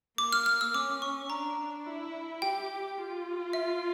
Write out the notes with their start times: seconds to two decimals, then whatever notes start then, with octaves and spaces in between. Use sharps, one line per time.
0.18 A#3 D6
0.32 F6
0.46 F6
0.61 E6
0.74 C#4 D6
1.02 C#6
1.30 D4 A#5
1.86 E4
2.42 G4 G5
2.98 F4
3.53 E5